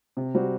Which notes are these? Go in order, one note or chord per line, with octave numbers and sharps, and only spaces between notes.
C3
G3 C4 F#4